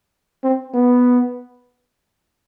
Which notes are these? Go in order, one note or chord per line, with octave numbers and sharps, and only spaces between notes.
C4
B3